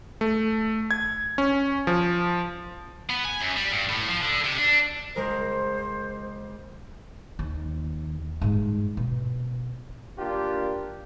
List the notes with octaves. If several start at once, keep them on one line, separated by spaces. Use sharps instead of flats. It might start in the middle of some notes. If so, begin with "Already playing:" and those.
A3
G#6
C#4
F3
B3
G#5
F#2
G3
G2
A2
F3
D3
C3
D4
C#2 G#3 A#4 C5
D#2
G#2 G3
B2
A#3 D4 F4 G4